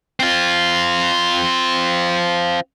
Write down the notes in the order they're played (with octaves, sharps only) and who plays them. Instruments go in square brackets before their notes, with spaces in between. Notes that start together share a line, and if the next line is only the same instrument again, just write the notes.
[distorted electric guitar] C4 F4